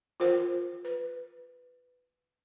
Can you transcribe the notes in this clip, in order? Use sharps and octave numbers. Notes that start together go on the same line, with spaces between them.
F4 A#4 C5
B4